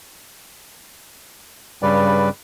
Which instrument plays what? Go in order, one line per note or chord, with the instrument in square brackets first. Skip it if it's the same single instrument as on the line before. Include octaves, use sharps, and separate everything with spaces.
[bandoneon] G2 C#3 G3 B4 D5